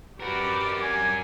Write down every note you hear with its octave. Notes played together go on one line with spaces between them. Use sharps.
F#4 G4 A#4 B4 D5
G#5